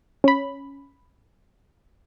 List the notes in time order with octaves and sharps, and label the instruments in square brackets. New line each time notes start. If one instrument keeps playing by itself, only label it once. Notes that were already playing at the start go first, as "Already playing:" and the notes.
[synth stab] C#4 B5